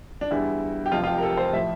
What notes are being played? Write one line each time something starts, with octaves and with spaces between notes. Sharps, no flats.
D4
E2 D3 G3 E4
G4
F1 F2 C3 F3 F4
F4
G4
A#4
A4
C5
A2 F3 E5